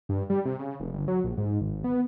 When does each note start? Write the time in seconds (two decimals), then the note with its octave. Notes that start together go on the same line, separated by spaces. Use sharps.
0.09 G2
0.30 G3
0.45 C3
0.59 C#3
0.80 F1
0.93 G1
1.08 F#3
1.24 A#1
1.37 G#2
1.61 G#1
1.84 B3